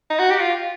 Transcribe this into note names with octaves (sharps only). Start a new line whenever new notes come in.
D#4
F#4
G4
F4